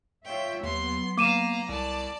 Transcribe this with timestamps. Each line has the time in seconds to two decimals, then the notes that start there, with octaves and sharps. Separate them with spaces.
0.25 F4 C#5 E5 G5
0.63 D#2 F#3 B3 C6
1.17 A#3 F5 A#5 D6 D#7 E7
1.69 C2 D5 A5